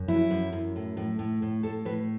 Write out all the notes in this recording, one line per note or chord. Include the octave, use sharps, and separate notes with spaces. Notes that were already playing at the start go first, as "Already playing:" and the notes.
Already playing: F#2
F#3 E4
F#2
F#2
A2
A2
A2
A2
A2 A4
A2 B4